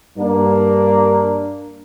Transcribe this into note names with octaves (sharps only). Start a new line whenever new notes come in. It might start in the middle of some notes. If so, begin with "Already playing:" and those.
G2 A#3 D4